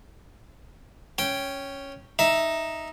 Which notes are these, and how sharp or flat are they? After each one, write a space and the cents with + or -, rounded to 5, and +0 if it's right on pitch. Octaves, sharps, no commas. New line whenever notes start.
C#4 +0 G5 +0
D#4 +0 E5 +0